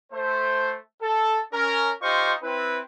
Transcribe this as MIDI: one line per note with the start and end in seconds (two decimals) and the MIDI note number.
0.12 0.78 57
0.12 0.78 72
1.02 1.40 69
1.53 1.92 61
1.53 1.92 70
2.02 2.34 63
2.02 2.34 65
2.02 2.34 67
2.02 2.34 72
2.02 2.34 75
2.02 2.34 85
2.43 2.80 60
2.43 2.80 64
2.43 2.80 71